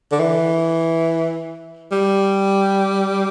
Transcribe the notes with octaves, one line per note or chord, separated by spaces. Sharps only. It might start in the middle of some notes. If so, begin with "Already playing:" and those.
D3
E3
G3